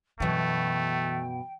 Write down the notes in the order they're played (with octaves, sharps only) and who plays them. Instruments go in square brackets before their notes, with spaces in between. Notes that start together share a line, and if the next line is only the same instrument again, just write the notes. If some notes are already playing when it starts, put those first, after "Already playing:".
[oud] F#2 B2 [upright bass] E3 [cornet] A3 [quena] G5